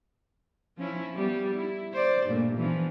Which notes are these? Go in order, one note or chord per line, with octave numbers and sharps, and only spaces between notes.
F3 C#4 E4
G3 B3 G4
E4
C5 D5
G2 A#2 A3
E3 F3 B3